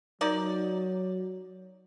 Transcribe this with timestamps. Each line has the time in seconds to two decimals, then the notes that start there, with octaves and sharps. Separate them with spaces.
0.21 F#3 D#4 A#4 D5